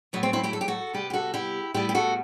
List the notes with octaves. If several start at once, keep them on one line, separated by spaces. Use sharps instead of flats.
A2 F#3 A3 B3
C4
C4 E4
E4 G4
A4
G4
F#4 A4
C3 G3 B3 G4 B4
G4
F#4 A4
E4 G4
A2 G3 B3 E4 G4
G4
F#4 A4